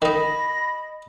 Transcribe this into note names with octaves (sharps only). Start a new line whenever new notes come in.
D#3 D#4 D#5 B5 A#6